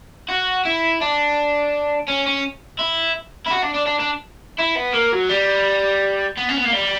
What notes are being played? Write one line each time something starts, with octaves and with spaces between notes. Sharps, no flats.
F#4
E4
D4
C#4
C#4
E4
E4
F#4
D4
D4
D4
D4
E4
B3
A#3
F#3
G3
B3
C#4
B3
A#3
G3